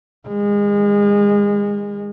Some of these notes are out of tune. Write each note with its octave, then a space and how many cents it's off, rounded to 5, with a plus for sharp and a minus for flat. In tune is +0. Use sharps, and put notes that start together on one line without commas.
D#3 +0 G#3 -30